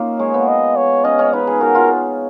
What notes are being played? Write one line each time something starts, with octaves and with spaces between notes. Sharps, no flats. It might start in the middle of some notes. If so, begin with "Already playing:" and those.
Already playing: A#3 C#4 D#4 F4
G#3 C#5
B3
D#5
C#5
C#4 D#5
C#4
D#4 B4
G#4
F#4 A#4
F4